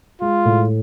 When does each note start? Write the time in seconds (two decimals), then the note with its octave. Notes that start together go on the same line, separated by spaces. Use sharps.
0.21 G#3 F4
0.45 A2